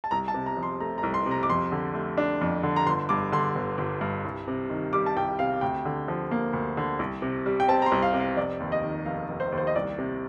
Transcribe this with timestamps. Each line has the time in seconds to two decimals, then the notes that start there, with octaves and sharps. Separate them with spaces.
0.04 A5
0.11 C2 A#5
0.28 A5
0.34 C3
0.46 A#5
0.57 F3
0.63 C6
0.80 A3 A#5
0.98 A#5
1.03 C2
1.14 C6
1.26 C3
1.31 A#5
1.43 D6
1.50 F2 C6
1.72 D3
1.94 A3
2.18 D4
2.41 F2
2.63 D3
2.76 A#5
2.86 G1 C6
3.09 G2 D6
3.32 D3 C6
3.55 G1
3.78 G1
4.01 G2
4.25 C2
4.48 C3
4.70 D#3
4.93 G3 D6
5.06 A5
5.16 C2 G5
5.39 C3 F5
5.61 D2 G5
5.85 D3
6.08 F3
6.31 A#3
6.53 D2
6.77 D3
6.99 C2
7.22 C3
7.46 G3
7.60 G5
7.68 C4 A5
7.82 A#5
7.86 C6
7.92 C2
8.02 F5
8.14 C3
8.20 F5
8.37 F1 D5
8.60 D#2
8.72 D#5
8.83 D#3
9.06 F1 F5
9.29 F1
9.40 C5
9.52 D#2
9.58 C5
9.67 D#5
9.75 C2 D5
9.98 C3